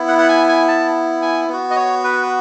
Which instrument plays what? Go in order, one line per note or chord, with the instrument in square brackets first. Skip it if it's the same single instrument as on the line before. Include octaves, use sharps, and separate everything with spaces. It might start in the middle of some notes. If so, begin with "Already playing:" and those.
Already playing: [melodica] B3 E4
F#5
F#5
G#5
G#5
A5
G#5
B3 F#4
D#5
C#5
B4